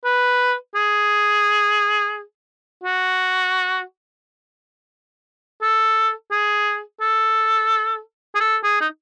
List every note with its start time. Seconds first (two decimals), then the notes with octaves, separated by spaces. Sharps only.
0.05 B4
0.75 G#4
2.83 F#4
5.62 A4
6.31 G#4
7.01 A4
8.35 G#4
8.40 A4
8.64 G#4
8.81 D#4